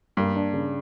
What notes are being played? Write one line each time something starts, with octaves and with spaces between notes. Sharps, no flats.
G2 A#3
D4
C#3